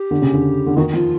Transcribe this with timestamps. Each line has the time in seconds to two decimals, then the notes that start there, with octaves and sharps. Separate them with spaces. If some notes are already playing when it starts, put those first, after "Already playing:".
Already playing: G4
0.11 D3
0.22 C#3
0.33 D3
0.66 D3
0.77 D#3 F#4
0.89 F#4
0.93 F3 F4